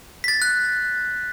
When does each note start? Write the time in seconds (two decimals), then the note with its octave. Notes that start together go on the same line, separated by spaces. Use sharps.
0.24 A6 B6
0.42 F#6